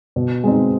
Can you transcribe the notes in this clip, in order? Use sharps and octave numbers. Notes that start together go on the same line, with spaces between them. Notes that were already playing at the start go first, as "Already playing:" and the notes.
B2
G#3 C4 D#4